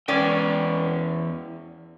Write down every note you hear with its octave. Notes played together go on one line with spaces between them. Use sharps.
E2 C#4 B4 D5 G5